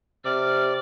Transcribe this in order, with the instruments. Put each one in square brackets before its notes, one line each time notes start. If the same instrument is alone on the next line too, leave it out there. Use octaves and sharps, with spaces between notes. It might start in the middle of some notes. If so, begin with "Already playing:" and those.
[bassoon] C3 [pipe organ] D5 D6 [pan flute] F6